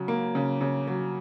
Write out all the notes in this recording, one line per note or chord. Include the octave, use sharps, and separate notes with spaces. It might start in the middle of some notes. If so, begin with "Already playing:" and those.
Already playing: C#3 F#3
A#3
C#3
C#3
F#3